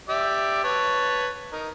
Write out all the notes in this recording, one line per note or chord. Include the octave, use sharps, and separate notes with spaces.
G4 D5 E5
B4 C#5 A5
D#4 A#4